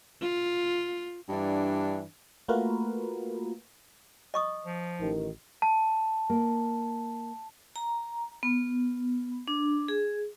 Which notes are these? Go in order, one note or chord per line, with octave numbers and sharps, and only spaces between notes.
F4
G2 E3 D4
A3 A#3 F4 F#4 A#4 B4
D#5 C#6 D#6
F3
A1 D#3
A5
A#3
A#5
B3
D4
G#4